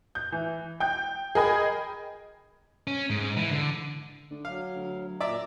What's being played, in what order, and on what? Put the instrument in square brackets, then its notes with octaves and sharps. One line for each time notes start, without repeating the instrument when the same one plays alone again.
[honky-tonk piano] G6
E3
G5 G6
G#4 A#4 D#5 G5 B5 G#6
[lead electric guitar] C#4
G#2
E3
D3
[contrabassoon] D3
[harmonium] F#3 [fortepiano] F5
[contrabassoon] D2
[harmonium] A#2 A#5 [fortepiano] D5 E5 D6